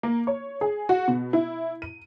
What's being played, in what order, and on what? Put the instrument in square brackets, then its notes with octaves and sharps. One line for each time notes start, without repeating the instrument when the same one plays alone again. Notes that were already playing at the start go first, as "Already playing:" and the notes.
[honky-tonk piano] A#3
C#5
G#4
F#4
B2
E4
D#7